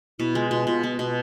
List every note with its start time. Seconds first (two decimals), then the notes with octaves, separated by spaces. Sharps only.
0.19 B2 E4
0.35 G#3 F4
0.51 B2 F4
0.67 B2 F4
0.83 B3
0.99 B2